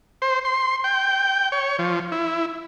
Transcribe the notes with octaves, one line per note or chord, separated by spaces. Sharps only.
C5
C6
G5
C#5
F3
E4